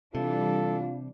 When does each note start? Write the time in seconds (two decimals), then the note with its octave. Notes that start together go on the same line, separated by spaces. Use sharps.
0.15 C3 E3 G3 D4 F4 A4